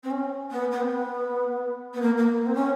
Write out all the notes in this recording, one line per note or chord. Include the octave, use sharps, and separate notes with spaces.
C4
C#4
B3
B3
C4
B3
B3
A#3
A#3
C4
C#4